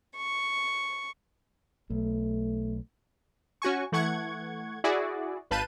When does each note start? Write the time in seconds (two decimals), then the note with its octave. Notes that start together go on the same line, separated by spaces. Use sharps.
0.16 C#6
1.90 B1 A3
3.62 C#4 F#4 G#5 C#6
3.92 E3 A3 F#5 C#6 G#6
4.84 E4 F#4 G#4 D5
5.51 G#1 B4 F5 A5 G6 D#7